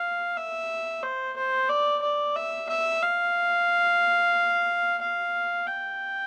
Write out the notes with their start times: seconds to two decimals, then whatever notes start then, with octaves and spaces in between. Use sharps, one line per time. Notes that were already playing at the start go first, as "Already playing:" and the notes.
Already playing: F5
0.38 E5
1.03 C5
1.37 C5
1.69 D5
2.02 D5
2.36 E5
2.69 E5
3.03 F5
5.02 F5
5.67 G5